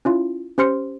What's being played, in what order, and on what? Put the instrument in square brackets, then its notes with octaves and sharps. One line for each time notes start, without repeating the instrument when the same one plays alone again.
[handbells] C#4 E4 F4
C#4 G4 C5 C6 F6 C#7